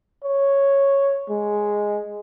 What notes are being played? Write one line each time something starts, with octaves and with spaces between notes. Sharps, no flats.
C#5
G#3